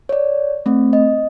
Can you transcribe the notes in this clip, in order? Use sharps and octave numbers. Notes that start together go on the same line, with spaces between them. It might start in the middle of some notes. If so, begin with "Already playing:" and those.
C#5 D5
A3 C4
D#5